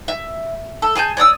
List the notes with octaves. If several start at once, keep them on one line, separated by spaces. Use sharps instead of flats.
E5
A4
G#4 G#5 A5 G6
C#5 D5 D#6 E6